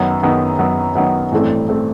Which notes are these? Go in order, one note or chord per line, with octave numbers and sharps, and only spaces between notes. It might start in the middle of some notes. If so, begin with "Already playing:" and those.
Already playing: F#2 D#3 F#3 B3
F#2 D#3 F#3 B3
F#2 D#3 F#3 B3
F#2 D#3 F#3 B3
A1 G2 E3 A3 C4
E3 A3 C4